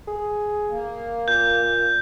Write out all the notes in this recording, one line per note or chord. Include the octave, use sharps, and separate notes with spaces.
G#4
A#3
A#2 G6